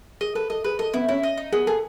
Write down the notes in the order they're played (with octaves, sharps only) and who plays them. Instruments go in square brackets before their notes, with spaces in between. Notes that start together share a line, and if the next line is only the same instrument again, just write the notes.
[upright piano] G#4 [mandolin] D#5
[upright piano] A4 [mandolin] B4
[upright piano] A4 [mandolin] D#5
[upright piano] G#4 [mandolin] B4
[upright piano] A4 [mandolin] D#5
[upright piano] B3 B4 [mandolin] E4
[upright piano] C#4 C#5 [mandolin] E4
[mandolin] D#5
D#4
[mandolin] B3 [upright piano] G#4
[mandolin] G#4 [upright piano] A4